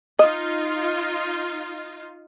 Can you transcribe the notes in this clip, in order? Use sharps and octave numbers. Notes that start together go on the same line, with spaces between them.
D#4 F4 D#5